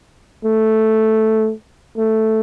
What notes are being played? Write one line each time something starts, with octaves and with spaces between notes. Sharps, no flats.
A3
A3